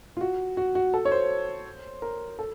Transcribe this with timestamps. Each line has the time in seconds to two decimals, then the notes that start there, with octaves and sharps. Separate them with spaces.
0.17 F4
0.21 F#4
0.57 F#4
0.75 F#4
0.94 A4
1.05 C#5
1.12 C5
2.02 A#4
2.39 A4